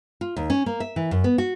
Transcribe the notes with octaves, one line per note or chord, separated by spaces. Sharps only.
F4
D#2
C#4
A#3
E5
E3
F#2
B3
F#4